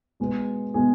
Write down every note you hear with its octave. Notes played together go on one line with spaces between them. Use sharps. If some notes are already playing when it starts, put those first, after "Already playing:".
B2 G#3 B3
B2 G#3 B3 G#4